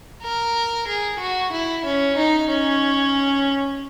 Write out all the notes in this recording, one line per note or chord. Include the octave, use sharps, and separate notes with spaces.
A#4
G#4
F#4
E4
C#4
D#4
C#4